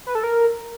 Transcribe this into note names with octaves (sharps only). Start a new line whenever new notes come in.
B4
A4
A#4